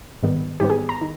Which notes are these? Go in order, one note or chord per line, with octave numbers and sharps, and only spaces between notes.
G#2 D#3 G3 B3
G#2 D#3 G3 B3 G4
G#4
A#5
D#3